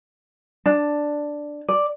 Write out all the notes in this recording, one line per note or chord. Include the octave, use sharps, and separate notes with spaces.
D4
D5